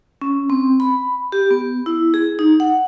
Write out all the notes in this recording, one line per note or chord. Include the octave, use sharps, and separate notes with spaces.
C#4
C4
B5
G4
B3
E4
G#4
D#4
F#5